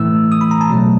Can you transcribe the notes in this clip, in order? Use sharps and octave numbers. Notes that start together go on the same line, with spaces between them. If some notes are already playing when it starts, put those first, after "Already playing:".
Already playing: A2 E3 A3 E6
D#6
B5
A#5
A5
B2 F#3 A3